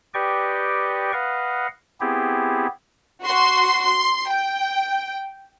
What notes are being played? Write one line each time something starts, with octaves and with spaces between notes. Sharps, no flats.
G4 B4 D5 D#5 G5 C#6
B4 D#5 F5 F#5
B3 C4 E4 G4 G#4
F#4 C6
C6
G5